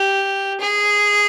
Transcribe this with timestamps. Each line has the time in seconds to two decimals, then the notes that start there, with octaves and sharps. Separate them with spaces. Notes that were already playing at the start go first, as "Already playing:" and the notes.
Already playing: G4
0.61 G#4